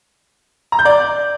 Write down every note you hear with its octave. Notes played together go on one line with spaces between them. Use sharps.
A#5
G6
D5